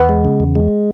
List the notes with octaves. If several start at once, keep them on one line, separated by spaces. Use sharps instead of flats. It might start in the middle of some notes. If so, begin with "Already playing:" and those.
Already playing: E2 B3
G#3
C#3
E2
G#3